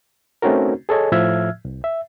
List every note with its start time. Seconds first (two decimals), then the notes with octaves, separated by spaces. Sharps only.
0.42 A3 C4 C#4 D#4 F#4 A#4
0.89 G#4 A4 C#5 D#5 G#5
1.12 A2 F3 E5 E6 F6 G#6
1.65 C2
1.84 E5